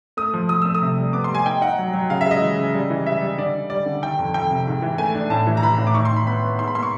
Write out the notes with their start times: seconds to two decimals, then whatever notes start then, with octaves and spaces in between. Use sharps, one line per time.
0.17 A3 D#6
0.34 F3
0.49 F3 D#6
0.62 A3 E6
0.75 D#6
0.82 C3
0.97 G3
1.13 B3 D6
1.24 C6
1.29 G3
1.35 G#5
1.45 D#4 G5
1.61 D#4 F#5
1.78 F#3
1.94 F#3
2.10 C#3 F5
2.21 E5
2.26 G#3 D#5
2.42 E3
2.59 C#3
2.74 G3
2.90 E3
3.06 G3 E5
3.21 G3
3.38 D3 D5
3.55 D3
3.70 G3 D5
3.86 D3
4.02 D#3 G5
4.19 F2
4.34 F2 G5
4.51 C3
4.67 G#2
4.82 E3
4.98 A3 G#5
5.15 D4
5.30 A2 A5
5.47 E3
5.57 A#5
5.62 E3 B5
5.78 A2
5.87 D6
5.94 D#3 C#6
6.05 C6
6.11 D#3
6.16 B5
6.27 B3 B5
6.43 B3
6.59 G#2 C6
6.68 B5
6.75 A#3 C6
6.83 C#6